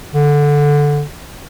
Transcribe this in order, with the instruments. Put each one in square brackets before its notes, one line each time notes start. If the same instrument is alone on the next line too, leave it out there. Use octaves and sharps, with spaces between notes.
[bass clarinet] D3